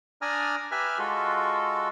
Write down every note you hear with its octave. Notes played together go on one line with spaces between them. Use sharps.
D4 D5 G#5 A#5 D#6 F6
G4 B4 E5 G#5 B5 F6
G#3 F4 F#4 A4